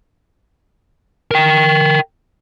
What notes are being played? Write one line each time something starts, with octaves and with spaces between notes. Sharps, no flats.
A#4 G5